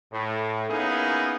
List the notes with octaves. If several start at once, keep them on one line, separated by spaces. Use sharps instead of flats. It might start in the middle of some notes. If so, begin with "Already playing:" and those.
A2
A#3 B3 C#4 D#4 E4 G#4